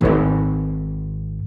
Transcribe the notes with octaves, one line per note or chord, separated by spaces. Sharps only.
G#1 G#2